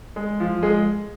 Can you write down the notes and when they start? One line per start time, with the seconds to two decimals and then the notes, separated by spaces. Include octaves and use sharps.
0.16 G#3
0.40 F3
0.63 G#3 G#4